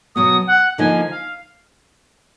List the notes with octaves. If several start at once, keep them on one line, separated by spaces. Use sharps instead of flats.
B2 F#3 B3 D#6
F#5
D3 F3 A#3 D#4 A#4 G#5
F5